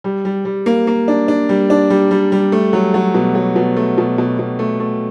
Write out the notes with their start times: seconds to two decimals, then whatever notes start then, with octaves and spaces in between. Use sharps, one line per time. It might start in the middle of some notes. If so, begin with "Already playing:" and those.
0.04 G3
0.25 G3
0.45 G3
0.66 A#3
0.87 A#3
1.08 D4
1.28 D4
1.49 G3
1.70 D4
1.90 G3
2.11 G3
2.32 G3
2.52 A3
2.73 F#3
2.94 F#3
3.14 B2
3.35 F#3
3.56 B2
3.76 A3
3.98 B2
4.18 B2
4.39 B2
4.59 A3
4.80 A3